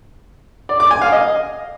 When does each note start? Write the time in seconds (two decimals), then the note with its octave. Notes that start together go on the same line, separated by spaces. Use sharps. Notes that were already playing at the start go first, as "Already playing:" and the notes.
0.69 D5
0.80 D6
0.91 G#5
1.01 F5
1.12 D#5